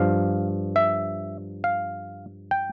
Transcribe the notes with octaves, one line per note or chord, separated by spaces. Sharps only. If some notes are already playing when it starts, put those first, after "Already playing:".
Already playing: G2 F3 F5
E5
F5
G5